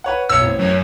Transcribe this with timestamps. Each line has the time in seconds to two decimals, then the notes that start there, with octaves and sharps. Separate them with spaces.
0.04 B4 C#5 F#5
0.30 B1 C#5 E6 C#7
0.42 A1 C4
0.59 F#2 C#5